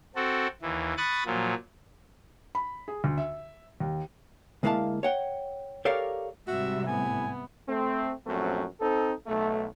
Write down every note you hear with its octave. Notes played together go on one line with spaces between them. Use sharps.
C4 F#4 A4
D#2 E3
B5 C#6 D#6 F#6 A6
A#2 F3 F#3
B5
G#4
D2
E5
D#2
D2 G#3 A#3 E4 F5 A5
C#5 F#5 G5
G4 A4 A#4 C#5 D5 F5
G#2 C3 G3 F#4 E5
A2 B3 G#5
A3 C4
A#1 F#2 F#3 A3 C4
C4 D#4 A4
B1 A3